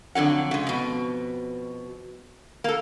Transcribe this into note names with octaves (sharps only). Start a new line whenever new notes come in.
F2 D3 F#3 F#5
C#3 G#3
F2 B2
A#3 A4